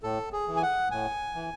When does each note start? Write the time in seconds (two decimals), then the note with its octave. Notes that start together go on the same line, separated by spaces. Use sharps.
0.03 A2 A4
0.32 G#4
0.48 E3
0.56 G#5
0.62 F#5
0.91 A2 G#5
1.35 E3